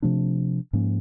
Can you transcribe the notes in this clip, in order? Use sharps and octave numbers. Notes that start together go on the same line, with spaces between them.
C3 F3 A3 D4
G#2 F3 A#3 C#4